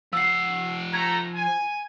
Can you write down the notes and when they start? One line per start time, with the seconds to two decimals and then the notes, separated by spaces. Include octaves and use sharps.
0.13 F3 F#5 E6 C7
0.93 A3 A#5 G#6
1.34 G#5